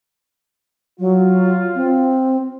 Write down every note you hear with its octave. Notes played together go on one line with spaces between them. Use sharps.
F#3 F4
C4